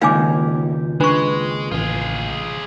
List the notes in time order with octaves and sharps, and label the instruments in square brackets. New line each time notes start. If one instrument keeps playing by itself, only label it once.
[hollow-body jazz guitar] C#2 A#2 D#3 [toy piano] F5 G#5 D6
[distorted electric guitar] G#3 [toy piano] D4 C#6 [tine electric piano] B4
[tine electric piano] A1 [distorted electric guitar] F4 G#4